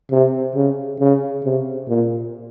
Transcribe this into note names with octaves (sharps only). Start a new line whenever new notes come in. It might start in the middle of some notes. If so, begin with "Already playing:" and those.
C3
C#3
C#3
C3
A#2